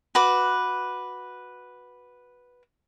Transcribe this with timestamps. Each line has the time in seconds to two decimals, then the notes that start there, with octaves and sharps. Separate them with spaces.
0.15 F#4 B4 D6